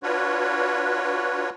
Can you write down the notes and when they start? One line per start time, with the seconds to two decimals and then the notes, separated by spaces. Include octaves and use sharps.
0.03 D4 F4 F#4 B4 C#5